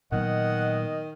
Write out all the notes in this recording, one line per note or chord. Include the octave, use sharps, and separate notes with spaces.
A#2 D#3 F#3 B3 D#5 F#5